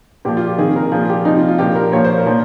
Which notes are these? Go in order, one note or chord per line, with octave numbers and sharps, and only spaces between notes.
A#2 F3 G4
F4
G4
C3 D#3 G#4
A#4
A#2 F3 G#4
F4
G4
C3 F3 D#4
F4
F4
A#2 F3 G4
A#4
A#2 F3 C#5
C5
A#4
A#2 F3